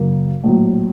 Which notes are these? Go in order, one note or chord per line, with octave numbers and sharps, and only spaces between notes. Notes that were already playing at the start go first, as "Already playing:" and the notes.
Already playing: F#2 C#3 F#3 A#3
A#1 A2 F#3